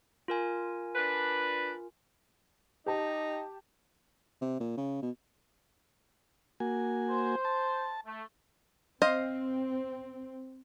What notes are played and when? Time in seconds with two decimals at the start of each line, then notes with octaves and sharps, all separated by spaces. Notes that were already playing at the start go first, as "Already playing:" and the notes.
0.28 F4 A#4 G#5
0.95 D4 B4
2.86 D#4 G4 A5
4.42 C3
4.60 A#2
4.78 C#3
5.02 B2
6.60 A#3 F#4 G#5
7.10 C5
7.45 A5
8.06 A3
9.02 C4 C5 D#5 F5